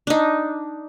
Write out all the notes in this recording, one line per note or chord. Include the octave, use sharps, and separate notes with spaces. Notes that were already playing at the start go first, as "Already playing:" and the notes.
D4 D#4